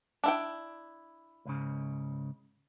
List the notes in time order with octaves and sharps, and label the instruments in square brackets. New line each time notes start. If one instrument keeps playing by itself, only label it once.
[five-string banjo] D4 E4 G5
[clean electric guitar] C#2 G#2 C#3